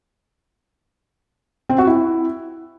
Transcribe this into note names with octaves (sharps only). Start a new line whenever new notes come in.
C4
F#4
E4